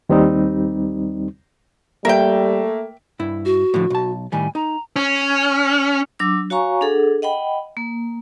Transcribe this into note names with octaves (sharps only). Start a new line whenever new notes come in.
D#2 G3 C4 D#4
G3 A3 A#3 A#4 E5 G5
G2 E4
F#4
A2 D3 F3
B1 A5
A2 D#3 G3 G#5
D#4 A#5
C#4
F#3 D4 D6 E6
F#4 C#5 F5 G#5 A#5 C#6
D4 G#4 A4 F#5
D#5 F#5 G5 B5
A#3